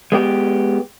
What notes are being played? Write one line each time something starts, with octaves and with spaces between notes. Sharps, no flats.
G#3 B3 G4